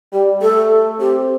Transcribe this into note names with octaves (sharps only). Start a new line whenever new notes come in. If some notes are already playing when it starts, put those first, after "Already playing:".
G3 G4
A3 A4
C4 G4